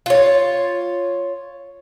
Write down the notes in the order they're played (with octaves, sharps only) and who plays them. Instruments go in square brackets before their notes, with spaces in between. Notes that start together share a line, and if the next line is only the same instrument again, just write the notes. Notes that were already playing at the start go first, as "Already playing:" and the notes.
[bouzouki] F4 C#5